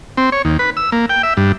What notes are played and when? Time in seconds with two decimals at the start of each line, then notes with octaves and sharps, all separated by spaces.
0.17 C4
0.32 C#5
0.45 D#2
0.59 B4
0.77 E6
0.92 A#3
1.09 G5
1.23 E5
1.37 G2